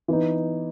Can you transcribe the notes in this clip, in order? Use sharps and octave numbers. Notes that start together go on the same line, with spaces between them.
E3 B3 D#4